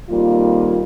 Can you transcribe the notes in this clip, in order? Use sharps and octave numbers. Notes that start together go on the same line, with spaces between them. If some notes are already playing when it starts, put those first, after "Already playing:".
F2 D#3 G3 A#3 F4